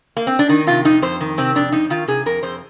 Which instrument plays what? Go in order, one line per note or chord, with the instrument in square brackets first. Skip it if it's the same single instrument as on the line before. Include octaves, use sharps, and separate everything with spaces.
[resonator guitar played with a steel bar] A#3
C4
D4
D#3 D#4
C3 F4
F2 D#4
F2 C5
D#3
C3 C4
F2 D4
F2 D#4
D#3 F4
C3 G#4
F2 A#4
F2 C5